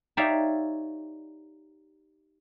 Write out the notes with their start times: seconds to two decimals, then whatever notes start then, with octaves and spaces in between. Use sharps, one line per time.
0.17 D#4 G4 C#5 D5 E5 F5